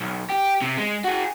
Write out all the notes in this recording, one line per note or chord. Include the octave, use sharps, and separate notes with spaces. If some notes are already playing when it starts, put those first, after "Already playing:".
B1
G4
C3
G#3
F#4 G#4